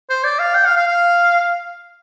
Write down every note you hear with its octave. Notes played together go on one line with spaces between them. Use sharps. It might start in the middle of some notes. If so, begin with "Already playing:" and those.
C5
D5
F5
G5
F5
F5
F5